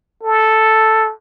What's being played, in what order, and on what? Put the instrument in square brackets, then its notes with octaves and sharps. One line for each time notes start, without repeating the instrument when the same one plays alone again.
[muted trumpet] A4